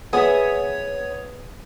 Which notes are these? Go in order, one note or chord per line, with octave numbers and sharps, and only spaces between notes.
B3 G#4 C#5 E5 D#6